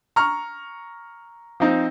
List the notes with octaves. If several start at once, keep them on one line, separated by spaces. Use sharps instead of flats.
A#5 C#6 F6
F3 C4 D#4